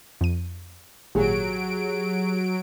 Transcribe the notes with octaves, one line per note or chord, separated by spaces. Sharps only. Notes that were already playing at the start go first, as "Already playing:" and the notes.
F2 D#7
G#1 A#2 F#3 G4 G#4 D7